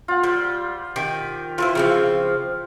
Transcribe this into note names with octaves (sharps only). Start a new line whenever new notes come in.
F4 F#5
G3 C5
D#3 G4
E3 E4 F4 A#4 C5
C#3 F3 C4 F5